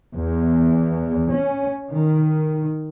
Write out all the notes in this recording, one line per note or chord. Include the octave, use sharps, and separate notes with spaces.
E2
C#4
D#3